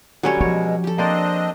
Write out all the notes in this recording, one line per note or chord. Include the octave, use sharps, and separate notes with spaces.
D3 F#3 G3 C#4 G4 C#5
B2 F3 G#3 C#5
G4 A4
A#3 C4 D4 C5 D5 D#5